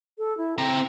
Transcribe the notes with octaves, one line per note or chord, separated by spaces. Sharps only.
A4
E4
C4 G5 A#5